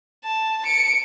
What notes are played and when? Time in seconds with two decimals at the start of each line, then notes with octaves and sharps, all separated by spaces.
0.24 A5
0.66 C#7 D7